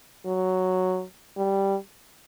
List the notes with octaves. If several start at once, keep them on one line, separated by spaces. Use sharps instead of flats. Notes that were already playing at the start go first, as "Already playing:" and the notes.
F#3
G3